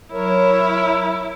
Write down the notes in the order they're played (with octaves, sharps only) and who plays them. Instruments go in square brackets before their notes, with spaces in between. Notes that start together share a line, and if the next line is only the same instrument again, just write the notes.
[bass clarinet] F#3 [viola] E4 [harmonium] A#4 C#5